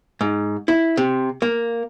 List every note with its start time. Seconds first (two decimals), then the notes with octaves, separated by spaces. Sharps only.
0.21 G#2
0.68 E4
0.97 C3
1.42 A#3